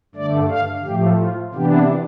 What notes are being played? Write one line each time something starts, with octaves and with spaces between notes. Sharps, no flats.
G2 D3 A3 D5
F5
A2 F3 A3 G4
F4
C3 E3 B3 D4 G4